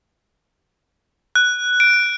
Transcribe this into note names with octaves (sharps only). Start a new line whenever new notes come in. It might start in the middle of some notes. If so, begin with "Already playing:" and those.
F#6
D7